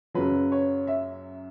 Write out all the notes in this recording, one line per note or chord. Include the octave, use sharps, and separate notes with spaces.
F#2 C#3 F#3 B4
C#5
E5